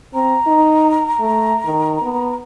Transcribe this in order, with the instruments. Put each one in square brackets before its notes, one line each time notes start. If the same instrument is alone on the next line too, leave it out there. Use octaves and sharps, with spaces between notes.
[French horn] C4 [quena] A#5
[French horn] D#4
A3
D#3
B3